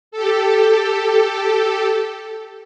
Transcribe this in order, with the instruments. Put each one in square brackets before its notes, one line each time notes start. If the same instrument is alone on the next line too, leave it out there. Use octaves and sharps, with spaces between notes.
[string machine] G4 A4